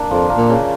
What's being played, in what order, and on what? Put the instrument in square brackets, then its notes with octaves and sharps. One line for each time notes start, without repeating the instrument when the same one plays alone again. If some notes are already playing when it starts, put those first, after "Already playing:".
Already playing: [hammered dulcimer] A#3 D4
[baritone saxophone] F2 [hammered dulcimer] F3
[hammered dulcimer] A#3
[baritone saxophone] A#2
[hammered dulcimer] C#3